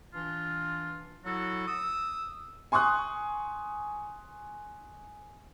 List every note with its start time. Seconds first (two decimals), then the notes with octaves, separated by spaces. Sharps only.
0.13 E3 D4 F4
1.24 F#3 E4 F#4 A4
1.66 D#6 E6
2.72 G#5 C6 C#6 D#6 F#6